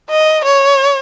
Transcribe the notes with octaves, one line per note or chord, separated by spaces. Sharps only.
D#5
C#5